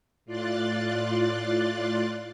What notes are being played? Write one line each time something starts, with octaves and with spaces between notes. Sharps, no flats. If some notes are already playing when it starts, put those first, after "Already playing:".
A2 F4 D5 C6 F#6 A6